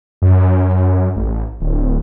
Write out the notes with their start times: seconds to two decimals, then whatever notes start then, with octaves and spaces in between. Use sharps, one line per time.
0.22 F#2
1.16 A1
1.61 D1